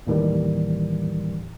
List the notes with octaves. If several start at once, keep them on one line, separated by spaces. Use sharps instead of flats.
D#2 A2 D#3 E3 G3